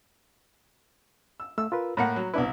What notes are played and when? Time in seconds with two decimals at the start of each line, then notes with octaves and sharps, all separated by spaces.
1.40 E6
1.58 A3 E6
1.72 F4 A#4 B4
1.97 A2 A#3 F#5 A#5 B5
2.16 F#3
2.34 C2 B3 D4 E4 B4